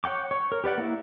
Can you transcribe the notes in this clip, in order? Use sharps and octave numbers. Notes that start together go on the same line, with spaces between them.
C#5 F#5 G5 D6
C#5
A#4
G4 B4 D5 F#5
A#3 E4